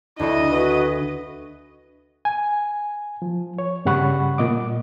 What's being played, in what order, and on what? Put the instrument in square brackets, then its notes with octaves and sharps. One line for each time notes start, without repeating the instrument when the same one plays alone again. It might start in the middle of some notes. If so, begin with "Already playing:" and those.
[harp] D2 A4 [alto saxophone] D4 [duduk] E4 [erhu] D#5
[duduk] F#4 [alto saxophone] B4
[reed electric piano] G#5
F3
C#5
G2 C#3 G3 F#5 B5 C#6
A#2 D#5 D6